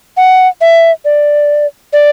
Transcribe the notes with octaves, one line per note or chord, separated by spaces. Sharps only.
F#5
E5
D5
D5